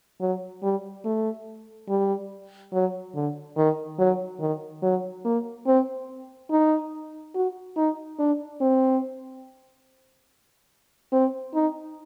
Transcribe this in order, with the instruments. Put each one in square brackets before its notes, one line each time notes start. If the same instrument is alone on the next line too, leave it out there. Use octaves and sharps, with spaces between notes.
[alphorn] F#3
G3
A3
G3
F#3
D3
D#3
F#3
D#3
F#3
A#3
C4
D#4
F#4
D#4
D4
C4
C4
D#4